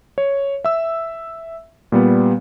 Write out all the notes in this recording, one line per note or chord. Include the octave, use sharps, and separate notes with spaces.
C#5
E5 E6
A#2 G3 B3